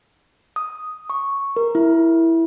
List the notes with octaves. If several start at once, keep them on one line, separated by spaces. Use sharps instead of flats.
D#6
C#6
A#4
E4